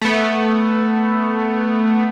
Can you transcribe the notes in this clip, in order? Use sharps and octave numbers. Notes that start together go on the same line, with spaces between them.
A3 B3